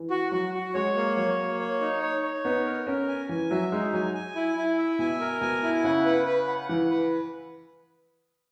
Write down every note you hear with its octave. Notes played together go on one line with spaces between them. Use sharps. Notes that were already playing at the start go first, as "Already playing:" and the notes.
Already playing: E3
F#4
F#3 F#4
F#4
G#3 C#5
A#3
F#3 C#5
A#3
C#5
D#4
C#5
C#5
B3 D#4
A#4
C#4 A#4
G#5
E3 G#5
F#3 E5
G#3 D#4
F#3 G#5
G#5
E4
E4
E5
B2 G#5
A#4
B2 G#5
E4
C#3 F#5
B4
B4
F#5
E3 F#5
B4